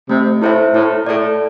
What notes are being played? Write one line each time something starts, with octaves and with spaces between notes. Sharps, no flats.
C3 A3
A2 E4 C5 E5
A2 E4
A2 A4 D5